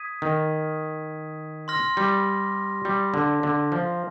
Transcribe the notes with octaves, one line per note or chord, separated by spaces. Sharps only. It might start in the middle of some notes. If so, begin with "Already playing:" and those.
Already playing: D#6 G#6 B6 D#7
D#3
C6 F6 A#6
G3
G3
D3
D3
F3